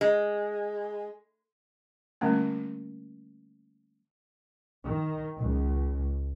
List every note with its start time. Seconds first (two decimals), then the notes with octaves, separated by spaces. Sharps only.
0.01 G#3
2.21 D3 G3 A3 A#3 C#4
4.84 D#3
5.37 C#2